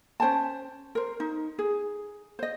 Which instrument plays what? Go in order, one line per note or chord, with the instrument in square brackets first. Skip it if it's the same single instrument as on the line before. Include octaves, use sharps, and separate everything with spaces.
[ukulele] C#4 C5 G5 A5
A#4 C5
D#4
G#4
C5 D#5